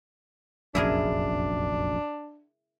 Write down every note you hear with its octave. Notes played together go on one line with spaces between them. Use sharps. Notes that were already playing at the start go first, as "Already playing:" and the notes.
F1 A#1 F#2 D4 E4 G#4 A#4